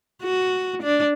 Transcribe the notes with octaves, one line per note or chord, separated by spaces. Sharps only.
F#4
D4